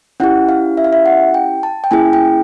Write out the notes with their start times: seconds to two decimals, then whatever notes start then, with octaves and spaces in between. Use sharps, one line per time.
0.20 C#4 E4 G4 F#5
0.49 F5
0.77 E5
0.84 F5
0.93 E5
1.06 F#5
1.34 G5
1.63 A5
1.84 G5
1.91 A#3 C#4 E4 G#4 G#5
2.13 G5